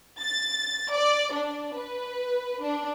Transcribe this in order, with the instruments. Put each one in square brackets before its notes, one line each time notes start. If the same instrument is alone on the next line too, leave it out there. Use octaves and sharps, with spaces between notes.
[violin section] A6
D5
D4
B4
D4